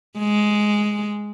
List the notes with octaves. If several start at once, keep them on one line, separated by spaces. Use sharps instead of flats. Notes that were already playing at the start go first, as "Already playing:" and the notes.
G#3